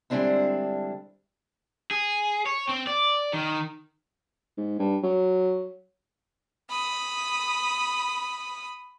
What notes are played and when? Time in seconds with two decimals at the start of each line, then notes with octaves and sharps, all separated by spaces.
0.10 D3 G3 G#3 C4 D4 E4
1.91 G#4
2.46 C#5
2.69 C4
2.87 D5
3.33 D#3
4.58 G#2
4.79 G2
5.03 F#3
6.70 B5 D#6